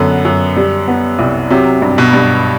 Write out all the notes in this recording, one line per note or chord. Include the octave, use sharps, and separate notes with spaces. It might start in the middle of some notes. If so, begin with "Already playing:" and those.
Already playing: F#2 D3 B3
F#2
G3
B3
C2
C3 F#3
G2
B2
G2